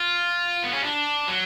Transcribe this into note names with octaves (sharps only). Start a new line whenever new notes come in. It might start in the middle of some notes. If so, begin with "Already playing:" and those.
Already playing: F4
B3
C#4
D4
F#3